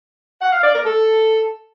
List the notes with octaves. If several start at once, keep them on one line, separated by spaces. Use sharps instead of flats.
F#5
F5
D5
A#4
A4